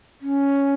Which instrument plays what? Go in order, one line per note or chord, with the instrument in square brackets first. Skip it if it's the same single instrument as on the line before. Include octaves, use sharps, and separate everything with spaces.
[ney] C#4